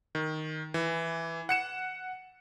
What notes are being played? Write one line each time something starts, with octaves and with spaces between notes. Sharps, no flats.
D#3
E3
F#5 C#7 E7